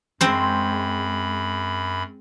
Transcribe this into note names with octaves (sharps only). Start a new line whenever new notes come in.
F#2 G#3 C4 C5 B5